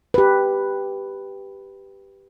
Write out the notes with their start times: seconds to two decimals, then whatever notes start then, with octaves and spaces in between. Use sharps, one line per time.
0.14 G4 B4